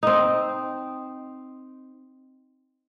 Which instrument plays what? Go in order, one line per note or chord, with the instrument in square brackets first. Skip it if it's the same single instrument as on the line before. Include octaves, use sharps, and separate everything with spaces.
[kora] C4 D#4